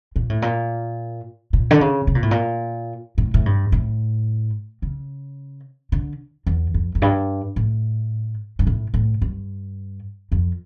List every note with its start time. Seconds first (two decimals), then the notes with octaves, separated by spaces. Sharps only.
0.16 A#2
0.30 A2
0.42 A#2
1.53 A#2
1.71 D3
1.81 C#3
2.07 C#3
2.15 A#2
2.22 A2
2.31 A#2
3.18 A2
3.34 A2
3.46 G2
3.72 A2
4.82 C#3
5.92 D3
6.47 E2
6.74 F2
6.95 F2
7.02 G2
7.56 A2
8.59 G2
8.67 A2
8.94 A2
9.22 G2
10.32 F2